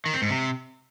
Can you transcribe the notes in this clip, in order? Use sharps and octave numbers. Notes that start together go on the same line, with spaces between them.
D#3
C4
G#2
C3